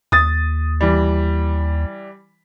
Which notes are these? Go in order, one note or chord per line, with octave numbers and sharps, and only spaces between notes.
D#2 D#6 A6
E3 G3